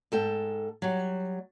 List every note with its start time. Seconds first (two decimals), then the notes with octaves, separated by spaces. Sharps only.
0.12 G#2 A4 G5
0.82 F#3 G3